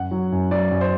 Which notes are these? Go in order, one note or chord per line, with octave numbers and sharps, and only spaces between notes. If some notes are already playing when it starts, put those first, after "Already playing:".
Already playing: F#2 F#5
F#3
F#2
F#3 D5
F#2
C5